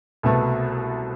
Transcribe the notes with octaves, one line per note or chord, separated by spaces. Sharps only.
C2 B2 A3